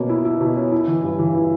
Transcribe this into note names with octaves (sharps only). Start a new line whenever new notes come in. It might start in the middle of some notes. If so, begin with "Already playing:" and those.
Already playing: B2 A#3 C#4
E4
E4
B2
C#4
E4
E3
G2
E3
E4